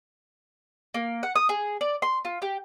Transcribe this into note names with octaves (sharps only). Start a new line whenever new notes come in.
A#3
F#5
D#6
G#4
D5
C6
F4
G4